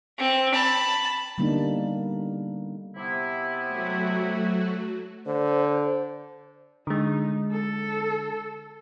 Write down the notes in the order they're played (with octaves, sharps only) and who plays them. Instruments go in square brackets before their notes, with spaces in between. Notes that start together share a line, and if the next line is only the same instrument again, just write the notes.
[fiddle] C4
A5 B5
[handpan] D3 G3 A#3 B3 D4 D#4
[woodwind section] C3 B3 E4
[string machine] F#3 A3 F#4
[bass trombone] D3 [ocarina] C5
[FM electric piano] D3 G#3 [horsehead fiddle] D#4
[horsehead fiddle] A4